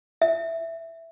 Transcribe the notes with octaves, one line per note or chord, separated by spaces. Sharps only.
E5